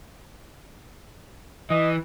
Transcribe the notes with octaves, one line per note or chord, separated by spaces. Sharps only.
E3 D#5